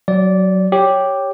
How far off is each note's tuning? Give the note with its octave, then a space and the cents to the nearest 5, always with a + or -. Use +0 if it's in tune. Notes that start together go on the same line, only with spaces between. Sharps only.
F#3 +10 D5 -15
G4 +0 C#5 +0